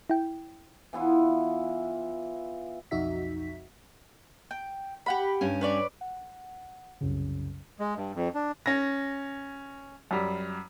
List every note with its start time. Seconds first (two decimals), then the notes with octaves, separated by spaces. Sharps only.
0.10 E4 G5
0.93 E3 B3 E4 F4
2.91 B1 F2 D#4 F#4 E5 B6
4.51 G5
5.06 G4 F#5 B5
5.41 G2 G3 C#4
5.61 B4 C#5 D5
6.01 F#5
7.01 C2 F#2 C#3
7.80 G#3
7.97 G2
8.15 F2
8.35 D4
8.66 C#4 A#6
10.11 F#2 G3